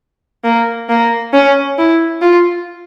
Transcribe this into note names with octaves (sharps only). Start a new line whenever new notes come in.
A#3
A#3
C#4
E4
F4